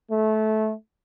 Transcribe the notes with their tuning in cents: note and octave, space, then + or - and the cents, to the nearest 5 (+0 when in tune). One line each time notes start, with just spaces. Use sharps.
A3 -20